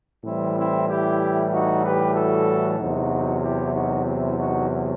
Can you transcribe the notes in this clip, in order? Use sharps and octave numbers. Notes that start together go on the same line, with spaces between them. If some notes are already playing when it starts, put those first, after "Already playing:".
A2 E3 G3 C4 E4
C4 E4
E4 G4
D#4 F#4
G4 B4
F#4 A4
E2 C3 F#3 D#4 F#4
E4 G4
D#4 F#4
C4 E4
D#4 F#4